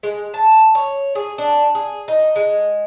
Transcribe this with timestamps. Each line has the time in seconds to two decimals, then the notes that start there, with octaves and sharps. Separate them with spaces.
0.03 G#3
0.34 A5
0.75 C#5
1.15 G#4
1.38 D4
1.75 G#4
2.08 D#4
2.36 G#3